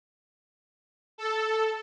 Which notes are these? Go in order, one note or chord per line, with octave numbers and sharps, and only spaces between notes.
A4